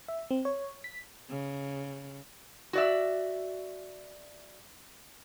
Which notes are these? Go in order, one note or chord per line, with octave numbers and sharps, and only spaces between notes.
E5
C4
C#5
B6
C#3
F#4 D5 E5